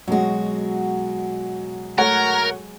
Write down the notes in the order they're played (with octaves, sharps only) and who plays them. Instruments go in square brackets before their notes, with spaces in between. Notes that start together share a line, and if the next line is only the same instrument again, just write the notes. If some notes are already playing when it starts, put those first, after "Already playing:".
[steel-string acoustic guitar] B2 F#4 [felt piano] F#3 G#3
[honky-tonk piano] A3 C#5 F#5 [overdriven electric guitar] A#4